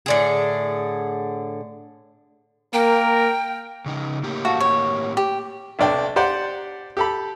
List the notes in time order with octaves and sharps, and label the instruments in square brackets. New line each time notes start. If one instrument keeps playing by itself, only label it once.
[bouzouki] A2 D3 G#4
[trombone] A#3 [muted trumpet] A#4 [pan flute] G5
[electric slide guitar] C#3 D#4
A2 A#3 G4
[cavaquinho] F#4 A4 F5
C#5
G4
[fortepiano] B1 C3 D4 G5
G4 C5 D5 F#5
G4 A4 B5